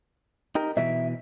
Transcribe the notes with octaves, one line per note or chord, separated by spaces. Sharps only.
D#4 G4 A#4
B2 E3 E5